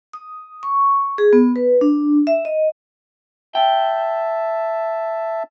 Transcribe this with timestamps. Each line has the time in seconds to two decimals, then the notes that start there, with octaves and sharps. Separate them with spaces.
0.13 D#6
0.63 C#6
1.18 G#4
1.33 B3
1.56 B4
1.81 D4
2.27 E5
2.45 D#5
3.55 E5 G5 A5